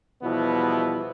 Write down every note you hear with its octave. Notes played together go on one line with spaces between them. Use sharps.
E2 B2 F3 G3 B3 E4